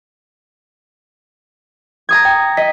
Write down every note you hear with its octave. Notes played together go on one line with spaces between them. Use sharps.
A#5 D#6 G#6
G5
D#5 G5 B6